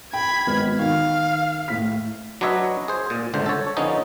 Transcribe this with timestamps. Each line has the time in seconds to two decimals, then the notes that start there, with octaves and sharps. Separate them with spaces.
0.13 G5 B5 G#6
0.47 G#1 B3 F6
0.79 D#3 F5
1.68 A2 B6
2.41 F#3 D4 B4 C#5 D#5 E5
2.88 G#4 C5
3.10 A#2
3.34 G1 C#2 D3 C5
3.46 A4 C#5
3.77 D3 F3 B3 C#4 D#4